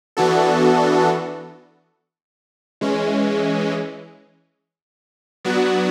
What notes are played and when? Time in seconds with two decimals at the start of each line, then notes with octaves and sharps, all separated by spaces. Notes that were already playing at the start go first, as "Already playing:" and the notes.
0.17 E3 B3 D4 F#4 A4
2.81 E3 G#3 C#4
5.45 F#3 B3 D4 F#4